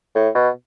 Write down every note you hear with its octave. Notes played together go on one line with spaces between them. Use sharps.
A2
B2